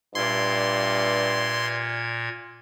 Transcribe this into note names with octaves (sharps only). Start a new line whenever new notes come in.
G2 A#2 D5 E5 C6 G#6